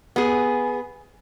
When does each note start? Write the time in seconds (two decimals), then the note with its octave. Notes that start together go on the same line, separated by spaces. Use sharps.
0.16 B3 G#4